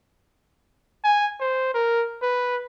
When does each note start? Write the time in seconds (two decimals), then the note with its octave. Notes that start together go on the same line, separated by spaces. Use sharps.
1.04 G#5
1.40 C5
1.74 A#4
2.22 B4